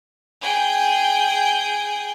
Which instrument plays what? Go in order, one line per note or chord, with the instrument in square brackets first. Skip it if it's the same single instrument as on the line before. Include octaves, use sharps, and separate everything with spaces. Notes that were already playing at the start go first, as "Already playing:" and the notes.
[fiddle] G#4 G5